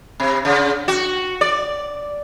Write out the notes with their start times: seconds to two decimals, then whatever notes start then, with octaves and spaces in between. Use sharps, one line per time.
0.20 C3
0.45 C#3
0.88 F#4
1.41 D5